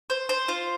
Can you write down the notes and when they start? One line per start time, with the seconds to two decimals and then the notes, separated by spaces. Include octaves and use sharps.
0.10 C5
0.29 C5
0.48 F4